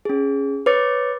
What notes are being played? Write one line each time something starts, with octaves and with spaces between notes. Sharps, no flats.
C#4 G#4
B4 C#5 D6 A6 C#7